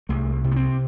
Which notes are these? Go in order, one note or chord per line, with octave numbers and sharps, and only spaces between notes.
C2 A3
C3
B3
C4